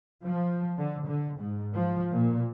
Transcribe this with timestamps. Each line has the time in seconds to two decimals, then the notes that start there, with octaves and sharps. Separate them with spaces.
0.24 F3
0.77 D3
1.06 D3
1.39 G#2
1.76 F3
2.12 A#2